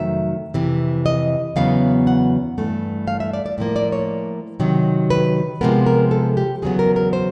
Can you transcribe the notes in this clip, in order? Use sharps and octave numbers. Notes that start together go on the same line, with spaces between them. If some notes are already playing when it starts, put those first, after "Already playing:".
Already playing: F2 C3 D#3 F#3 A3 E5
F2 C3 E3
D#5
E2 C#3 F#3 B3 F5
F#5
G2 E3 A3
F5
E5
D5
D5
A2 F3 A#3
D5
C#5
C3 D#3 F#3
B4
C3 F3 G#3 B3 A#4
A#4
A4
G4
E2 C#3 F#3 B3 G#4
A#4
A#4
C5